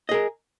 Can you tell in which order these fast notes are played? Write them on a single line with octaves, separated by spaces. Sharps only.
D#5 G#4 A#4